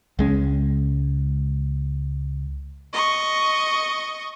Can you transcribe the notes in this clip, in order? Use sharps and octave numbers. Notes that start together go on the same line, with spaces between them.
C#2 G#3 C#4
D#5 C#6